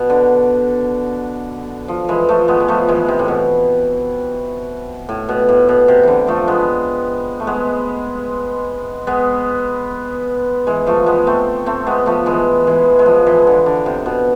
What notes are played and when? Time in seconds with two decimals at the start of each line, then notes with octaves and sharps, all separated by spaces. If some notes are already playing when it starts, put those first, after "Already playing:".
Already playing: B2
0.10 D3
1.88 F3
2.09 E3 G#3
2.29 F3 A3
2.48 G#3 B3
2.60 G#3
2.68 F3 A3
2.88 E3 G#3
3.08 C3
3.19 A2
3.28 B2
5.09 A2
5.29 B2
5.49 A2
5.69 B2
5.88 C3
6.03 D3 E3
6.27 F3 A3
6.48 G#3 B3
7.40 A3
7.47 G#3 B3
9.07 G#3 B3
10.67 E3 G#3
10.87 F3 A3
11.06 G#3 B3
11.27 A3 C4
11.66 A3 C4
11.87 G#3 B3
12.06 F3 A3
12.26 E3 G#3
12.67 E3 G#3
12.99 G#3
13.06 F3
13.27 E3
13.47 D3
13.66 D3
13.86 C3
14.06 B2